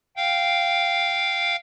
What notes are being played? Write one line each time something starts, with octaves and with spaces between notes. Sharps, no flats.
F5 G5